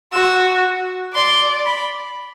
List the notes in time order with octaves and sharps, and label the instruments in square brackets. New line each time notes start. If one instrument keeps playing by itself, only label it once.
[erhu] F#4 [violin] E6
[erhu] D5 [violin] C6
[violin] B5